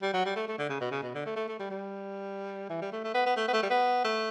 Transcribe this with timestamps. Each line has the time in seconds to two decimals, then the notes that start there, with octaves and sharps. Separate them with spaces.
0.02 G3
0.14 F#3
0.26 G3
0.36 A3
0.48 A3
0.58 D3
0.69 C#3
0.81 B2
0.91 C#3
1.03 B2
1.15 D3
1.26 A3
1.36 A3
1.48 A3
1.59 G3
1.70 G3
2.70 E3
2.82 G3
2.92 A3
3.04 A3
3.15 B3
3.26 B3
3.37 A3
3.48 B3
3.53 A3
3.63 G3
3.70 B3
4.05 A3